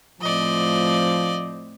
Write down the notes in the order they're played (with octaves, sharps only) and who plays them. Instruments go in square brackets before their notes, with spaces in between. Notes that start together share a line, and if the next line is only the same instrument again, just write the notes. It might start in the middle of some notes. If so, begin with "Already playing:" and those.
[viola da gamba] A2 C4 [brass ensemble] F3 [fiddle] D5 D#5